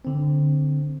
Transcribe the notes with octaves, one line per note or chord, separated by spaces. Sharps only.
D3 C4